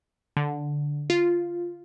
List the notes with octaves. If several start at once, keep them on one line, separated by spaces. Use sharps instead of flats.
D3
F4